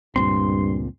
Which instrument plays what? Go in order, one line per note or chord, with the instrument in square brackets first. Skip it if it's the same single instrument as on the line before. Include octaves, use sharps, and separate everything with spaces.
[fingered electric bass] C#2 A#2 C4 [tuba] G2 [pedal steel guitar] C6